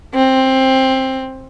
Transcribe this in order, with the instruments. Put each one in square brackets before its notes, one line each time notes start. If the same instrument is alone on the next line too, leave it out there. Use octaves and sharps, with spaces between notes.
[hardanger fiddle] C4